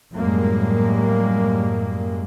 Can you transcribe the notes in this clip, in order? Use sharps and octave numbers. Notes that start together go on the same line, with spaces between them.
F#2 A2 G3 G#3 A#3